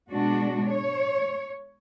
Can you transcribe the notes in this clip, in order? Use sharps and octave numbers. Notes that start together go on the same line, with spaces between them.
B2 G#3 D4 F#4
C#5